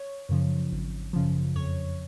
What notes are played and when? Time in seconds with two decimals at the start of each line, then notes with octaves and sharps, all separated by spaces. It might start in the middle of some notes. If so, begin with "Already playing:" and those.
Already playing: C#5
0.29 F#2 C#3 F3
0.72 G#1
1.13 F#2 C#3 F3
1.56 F2 C#5